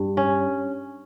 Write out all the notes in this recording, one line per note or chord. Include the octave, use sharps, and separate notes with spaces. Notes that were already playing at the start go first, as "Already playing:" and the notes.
Already playing: G2
C#4